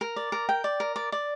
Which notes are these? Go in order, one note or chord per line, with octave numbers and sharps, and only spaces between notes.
A#4
D5
A#4
G5
D5
A#4
D5
D5